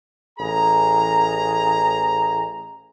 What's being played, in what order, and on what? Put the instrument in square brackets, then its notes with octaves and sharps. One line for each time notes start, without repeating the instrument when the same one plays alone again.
[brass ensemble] A1 G#4 A#5